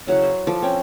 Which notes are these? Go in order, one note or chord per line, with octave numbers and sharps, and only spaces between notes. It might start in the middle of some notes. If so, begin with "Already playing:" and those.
C#3 F#3 E4 F#5
C5
F3 A4 D6
C4 C#4 G5